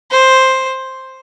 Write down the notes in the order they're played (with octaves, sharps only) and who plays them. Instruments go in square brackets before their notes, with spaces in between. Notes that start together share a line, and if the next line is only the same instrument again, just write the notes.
[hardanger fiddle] C5